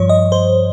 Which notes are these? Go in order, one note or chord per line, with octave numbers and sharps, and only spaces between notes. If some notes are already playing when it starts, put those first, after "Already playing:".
Already playing: G2 F3 C#5
D#5
C5